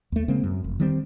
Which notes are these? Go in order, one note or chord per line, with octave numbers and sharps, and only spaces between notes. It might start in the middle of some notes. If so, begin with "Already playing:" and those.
D#2 A3
C#3 G#3 A#3 C4
F#2
F1
D#3 G3 C4